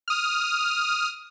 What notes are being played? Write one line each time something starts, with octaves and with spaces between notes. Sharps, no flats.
D#6 F6